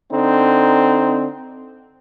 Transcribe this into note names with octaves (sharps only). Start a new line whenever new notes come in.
D3 C4 D#4